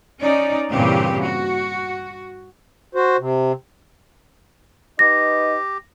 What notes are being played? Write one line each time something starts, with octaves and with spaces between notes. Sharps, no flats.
C#4 D#4 D5
G2 A#2 C#3 E3 C4 G4
F#4
F#4 C5
C3
D#4 G4 B4 D#5 A#6